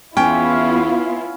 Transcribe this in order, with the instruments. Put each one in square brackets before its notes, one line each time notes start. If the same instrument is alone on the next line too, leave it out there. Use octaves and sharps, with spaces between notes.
[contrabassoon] E2 [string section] B3 E4 F4 [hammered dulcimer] C#4 [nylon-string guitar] G5